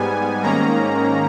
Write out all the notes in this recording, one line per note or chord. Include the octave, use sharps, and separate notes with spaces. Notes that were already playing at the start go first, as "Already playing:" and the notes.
Already playing: G#2 G3 B3 G#5
G#2 D#3 A#3 C#4 A#5